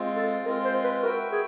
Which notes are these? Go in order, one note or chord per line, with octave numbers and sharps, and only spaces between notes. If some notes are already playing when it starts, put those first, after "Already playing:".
Already playing: G#3 C4 F4
A4
G#3 C4 F4 A#4
C5
B4
F#4 A#4 B4 E5 G5
G#4